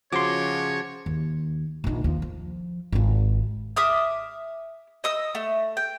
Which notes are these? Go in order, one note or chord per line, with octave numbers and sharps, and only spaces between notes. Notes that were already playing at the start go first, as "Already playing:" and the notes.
C#3 F3 F#4 C#5 C6 D6
D#2
A#1 D#4
D#2 F3
F3
G#1 F4
E5 D6 D#6 F6
D#5 D#6 E6
A3
G5